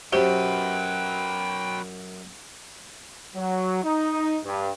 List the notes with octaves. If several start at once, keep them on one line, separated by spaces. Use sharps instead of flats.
F#2 F#3 G4 B4 C5 G5 G7
F#3
D#4
G2